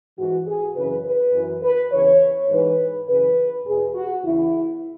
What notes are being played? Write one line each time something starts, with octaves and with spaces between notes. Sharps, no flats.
G#2 E3 F#4
G#4
F#2 C#3 E3 B4
B4
F#2 E3
B4
E2 C#3 E3 C#5
G#2 E3 B4
F#2 C#3 E3 B4
E2 B2 G#4
F#4
E2 C#3 E3 E4